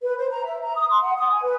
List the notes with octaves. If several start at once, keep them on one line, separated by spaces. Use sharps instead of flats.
B4
C5
A#5
E5
A#5
D#6
C6
F#5
D#6
G#5
B4